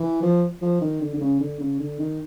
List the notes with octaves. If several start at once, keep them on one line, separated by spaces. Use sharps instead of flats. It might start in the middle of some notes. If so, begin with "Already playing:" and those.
Already playing: E3
F3
F3
D#3
D3
D3
C#3
D3
C#3
D3
D#3